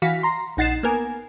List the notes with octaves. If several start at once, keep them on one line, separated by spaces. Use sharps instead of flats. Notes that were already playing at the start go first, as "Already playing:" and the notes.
E3 F#4 F5 B6
A#5 C6
A#1 D#4 F#5 A6 C7 E7
A#3 B3 A#4 G#5